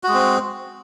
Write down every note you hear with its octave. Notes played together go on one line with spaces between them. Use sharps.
G#3 C4 F#4